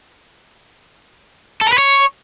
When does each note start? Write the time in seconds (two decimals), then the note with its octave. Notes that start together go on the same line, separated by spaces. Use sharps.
1.61 A4
1.67 A#4
1.73 B4
1.78 C#5